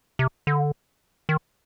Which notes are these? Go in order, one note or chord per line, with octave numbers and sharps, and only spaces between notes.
C3
D3
D#3